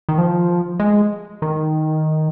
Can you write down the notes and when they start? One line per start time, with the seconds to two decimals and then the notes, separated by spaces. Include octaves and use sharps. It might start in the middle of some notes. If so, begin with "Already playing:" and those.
0.09 D#3
0.18 F3
0.80 G#3
1.42 D#3